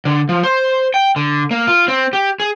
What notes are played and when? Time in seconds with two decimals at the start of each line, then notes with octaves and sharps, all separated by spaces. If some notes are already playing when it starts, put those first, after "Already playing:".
0.05 D3
0.29 F3
0.43 C5
0.94 G5
1.16 D3
1.51 A#3
1.67 F4
1.88 C4
2.13 G4
2.40 G#4